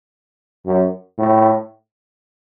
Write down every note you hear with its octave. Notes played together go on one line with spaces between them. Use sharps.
F#2
A2